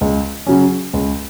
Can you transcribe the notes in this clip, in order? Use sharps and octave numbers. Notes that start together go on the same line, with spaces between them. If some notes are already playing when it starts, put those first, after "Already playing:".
C#2
C#3 F#3 C#4
C#2